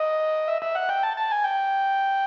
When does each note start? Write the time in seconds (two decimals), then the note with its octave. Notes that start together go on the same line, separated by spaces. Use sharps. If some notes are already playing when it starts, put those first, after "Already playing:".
Already playing: D#5
0.48 E5
0.62 E5
0.75 F#5
0.89 G5
1.03 A5
1.17 A5
1.31 G#5
1.44 G5